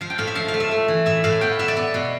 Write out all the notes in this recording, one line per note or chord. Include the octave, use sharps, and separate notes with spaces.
F3 F5
G5
A2 F5
E5
F3 F5
F5
A3
E5
A3
E3
A2 E5
A2 F5
B3 G5
B3 E5
D5
B3
B2